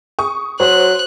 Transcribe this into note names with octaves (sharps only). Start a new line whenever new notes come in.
C#6 D#6
F#3 C5 F#6